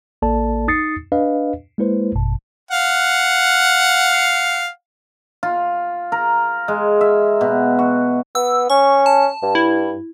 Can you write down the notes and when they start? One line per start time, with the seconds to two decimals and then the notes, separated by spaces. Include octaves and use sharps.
0.22 A1 A#3 A4 D5 A5
0.68 D#4 D#6 A6 C7 C#7
1.12 D4 B4 D#5 F5
1.78 G#3 A#3 E4 B4 C5
2.15 G#1 F#2 B2 A5
2.71 F5 F#5
5.43 F4
6.12 A#4
6.68 G#3
7.01 E5
7.41 B2
7.79 F#4
8.35 B3 E6
8.70 C#4 C#6
9.06 A5
9.43 G2
9.55 E4